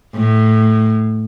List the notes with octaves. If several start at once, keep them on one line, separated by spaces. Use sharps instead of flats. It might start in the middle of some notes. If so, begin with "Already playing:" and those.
A2